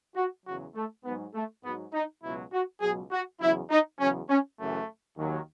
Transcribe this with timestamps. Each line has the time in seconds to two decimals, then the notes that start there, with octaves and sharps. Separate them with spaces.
0.16 F#4
0.46 E2 C#3 F#3 F#4
0.75 A3
1.05 G#2 F#3 B3
1.35 A3
1.65 G#2 F#3 B3
1.94 D#4
2.23 C#2 B2 F#3 E4
2.53 F#4
2.82 C#2 B2 F#3 G#4
3.12 F#4
3.41 E2 C#3 F#3 E4
3.71 D#4
4.00 E2 C#3 F#3 C#4
4.29 C#4
4.59 F#2 C#3 E3 A3
5.18 D#2 D#3 F#3